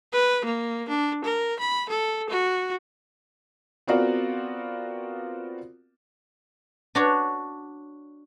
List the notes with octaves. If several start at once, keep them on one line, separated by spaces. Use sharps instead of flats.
B4
A#3
D4
A#4
B5
A4
F#4
B3 C4 F4 F#4 A#4 D5
D4 F#4 C#5